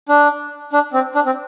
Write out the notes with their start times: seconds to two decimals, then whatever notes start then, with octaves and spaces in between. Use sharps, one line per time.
0.09 D4
0.73 D4
0.93 C4
1.15 D4
1.26 C4